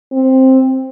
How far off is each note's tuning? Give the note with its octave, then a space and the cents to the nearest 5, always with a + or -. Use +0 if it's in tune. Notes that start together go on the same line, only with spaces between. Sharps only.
C4 +5